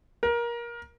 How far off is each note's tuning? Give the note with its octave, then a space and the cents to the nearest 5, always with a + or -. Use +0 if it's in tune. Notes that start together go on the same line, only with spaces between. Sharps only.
A#4 +20